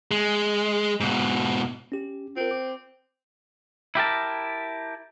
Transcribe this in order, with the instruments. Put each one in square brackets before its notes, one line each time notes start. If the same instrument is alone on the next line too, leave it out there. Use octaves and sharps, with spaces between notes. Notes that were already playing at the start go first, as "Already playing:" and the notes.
[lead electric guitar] G#3
G#2 B2
[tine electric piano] C#4 G4
[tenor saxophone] C4 [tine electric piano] F4 A#4
[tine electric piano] D6
[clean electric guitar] E4 G4 A#4 A5